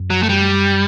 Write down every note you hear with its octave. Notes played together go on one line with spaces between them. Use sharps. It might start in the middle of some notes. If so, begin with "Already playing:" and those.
Already playing: F#2
F#3
A3
G3